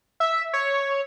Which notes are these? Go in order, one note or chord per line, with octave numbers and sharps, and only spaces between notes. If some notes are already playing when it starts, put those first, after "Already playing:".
E5
C#5